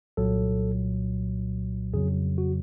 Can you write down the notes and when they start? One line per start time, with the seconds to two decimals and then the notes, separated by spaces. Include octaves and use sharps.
0.17 C2 A#2 F#3 A4
1.94 F2 C#3 F#3 G#4
2.38 F#4